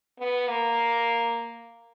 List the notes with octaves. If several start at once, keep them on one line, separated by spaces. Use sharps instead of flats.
B3
A#3